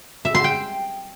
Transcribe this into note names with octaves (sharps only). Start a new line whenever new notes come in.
E5
C6
G5